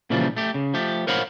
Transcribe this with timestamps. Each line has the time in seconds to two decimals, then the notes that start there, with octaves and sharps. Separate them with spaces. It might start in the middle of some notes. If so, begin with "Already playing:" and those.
0.10 A#2 C#3 E3 F3 G3
0.37 A3 G4
0.54 C#3
0.74 F3 A3 G4
1.07 A#4 C5 C#5 F5 F#5 B5